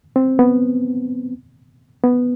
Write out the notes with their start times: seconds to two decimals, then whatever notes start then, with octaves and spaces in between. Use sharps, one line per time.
0.16 C4
0.39 B3
2.04 B3